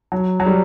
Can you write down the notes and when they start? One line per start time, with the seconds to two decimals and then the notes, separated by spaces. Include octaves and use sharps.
0.12 F#3
0.40 F#3
0.46 G3